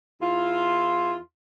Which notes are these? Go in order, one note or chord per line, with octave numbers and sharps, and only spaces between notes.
E2 E4 F4